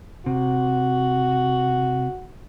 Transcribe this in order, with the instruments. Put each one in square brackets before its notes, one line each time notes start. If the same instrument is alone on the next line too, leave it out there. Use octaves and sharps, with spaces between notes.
[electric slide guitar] C3 [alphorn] F#4